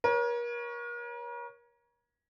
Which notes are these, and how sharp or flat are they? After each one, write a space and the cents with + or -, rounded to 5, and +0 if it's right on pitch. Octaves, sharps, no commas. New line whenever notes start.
A#4 +40 C#5 +0